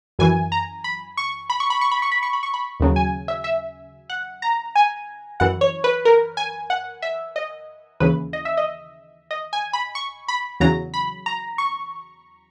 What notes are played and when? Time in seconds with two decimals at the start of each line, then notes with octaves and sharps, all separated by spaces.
0.19 F#2 E3 G#5
0.52 A#5
0.84 B5
1.17 C#6
1.50 B5
1.60 C#6
1.70 B5
1.81 C#6
1.91 B5
2.02 C#6
2.12 B5
2.23 C#6
2.33 B5
2.43 C#6
2.54 B5
2.80 D#2 C#3 F#3
2.96 G#5
3.28 E5
3.44 E5
4.10 F#5
4.42 A#5
4.75 G#5
5.40 F#2 E3 F#5
5.61 C#5
5.84 B4
6.05 A#4
6.37 G#5
6.70 F#5
7.02 E5
7.36 D#5
8.00 D#2 C#3 E3 B4
8.33 D#5
8.45 E5
8.57 D#5
9.31 D#5
9.53 G#5
9.73 B5
9.95 C#6
10.28 B5
10.60 E2 C#3 F#3 A#5
10.94 B5
11.26 A#5
11.58 C#6